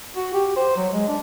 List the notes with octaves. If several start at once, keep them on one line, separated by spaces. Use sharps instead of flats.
F#4
G4
C5
F#3
G#3
D4